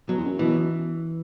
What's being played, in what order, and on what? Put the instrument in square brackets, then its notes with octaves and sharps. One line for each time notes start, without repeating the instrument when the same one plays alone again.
[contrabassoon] B2 [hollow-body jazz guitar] F#3
[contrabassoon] E2
F#2
[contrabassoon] B2 [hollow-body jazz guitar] E3